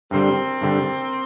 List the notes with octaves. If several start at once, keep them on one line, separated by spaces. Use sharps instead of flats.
G2 D3 G3 A#3 C4
G2 D3 G3